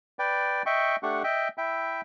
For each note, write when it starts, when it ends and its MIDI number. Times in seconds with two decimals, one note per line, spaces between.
0.19 0.62 71
0.19 0.62 74
0.19 0.62 79
0.66 0.96 75
0.66 0.96 76
0.66 0.96 79
0.66 0.96 85
1.03 1.23 57
1.03 1.23 62
1.03 1.23 67
1.03 1.23 78
1.03 1.23 85
1.24 1.48 75
1.24 1.48 76
1.24 1.48 79
1.58 2.01 64
1.58 2.01 76
1.58 2.01 79